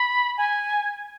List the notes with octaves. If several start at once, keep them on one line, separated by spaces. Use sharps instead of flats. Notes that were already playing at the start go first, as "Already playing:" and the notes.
Already playing: B5
G#5